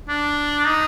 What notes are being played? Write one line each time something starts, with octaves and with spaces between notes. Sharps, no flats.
D4
D#4